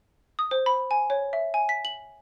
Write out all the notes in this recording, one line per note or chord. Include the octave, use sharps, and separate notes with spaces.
D#6
C5
B5
G#5
C#5
E5
G#5
B6
F#7